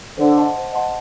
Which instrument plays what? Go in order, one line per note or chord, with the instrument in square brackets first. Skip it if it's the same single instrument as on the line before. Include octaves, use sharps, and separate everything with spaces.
[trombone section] D3 [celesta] C5
[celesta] D#5 F#5 A5 C6
C5
D#5 F#5 A5 C6